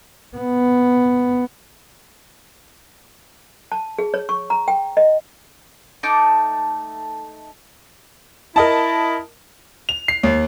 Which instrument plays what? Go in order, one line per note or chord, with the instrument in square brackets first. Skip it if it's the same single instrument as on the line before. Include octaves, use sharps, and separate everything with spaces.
[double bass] B3
[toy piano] A5
G#4
C#5
C#6
A#5
G5
D#5
[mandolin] A3 D#4 A5 D6
[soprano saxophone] E4 [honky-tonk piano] A#4 D#5 A5
[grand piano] F7
C7
D#2